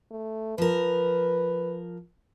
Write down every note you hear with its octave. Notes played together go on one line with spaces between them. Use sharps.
A3
F3 A#4 B4